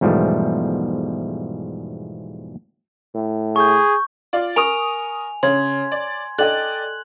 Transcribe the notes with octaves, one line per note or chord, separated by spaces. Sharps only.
E2 G#2 B2 F3 G3 A3
A2
G#4 C#6 G6
F4 D5
A#4 G#5 C#6 D#6 F7
C#3 C#5 C6 G#6
D5
A4 D5 D#5 G5 F#6 F#7